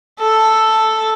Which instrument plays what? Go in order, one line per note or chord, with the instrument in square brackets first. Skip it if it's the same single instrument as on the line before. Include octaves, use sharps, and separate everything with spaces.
[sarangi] A4